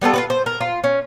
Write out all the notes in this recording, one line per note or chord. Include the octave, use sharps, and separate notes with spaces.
G3 B3 F4 A4
F4 F#4 B4
C5
A#4
F4
C#4